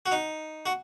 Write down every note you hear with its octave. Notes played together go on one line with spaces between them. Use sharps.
F#4
D#4
F#4